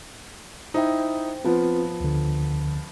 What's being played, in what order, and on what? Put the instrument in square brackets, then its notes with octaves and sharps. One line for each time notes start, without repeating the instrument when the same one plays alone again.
[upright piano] D#4 E4 [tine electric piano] C5 G5
[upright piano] F3 B3 [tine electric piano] C4 F4 B4
[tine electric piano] D2 D3